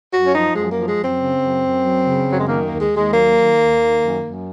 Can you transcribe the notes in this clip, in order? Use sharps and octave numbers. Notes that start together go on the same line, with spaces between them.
F#2 F#4
C#4
F3 D#4
F#2 G#3
A#3
F3
G#3
F#2
C4
C#3
F#2
F#2
F#3
C#3
F#2 F#3
G#3
D#3 A#3
A#3
D#2
G#3
D#2
G#3
F#3 A#3
D#3
D#2
D#3
F#2
F#2